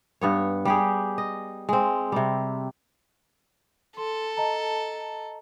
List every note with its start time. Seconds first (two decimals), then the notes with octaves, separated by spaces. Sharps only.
0.21 G2 B3 C#5
0.65 G3 G4 G#4
1.18 D#5
1.69 G#3 C4
2.12 C3 G3
3.97 A4 C6
4.37 D#5 A5 A#5